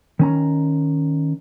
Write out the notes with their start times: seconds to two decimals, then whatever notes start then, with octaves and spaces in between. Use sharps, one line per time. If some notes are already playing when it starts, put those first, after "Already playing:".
0.19 D#3 C#4 A#5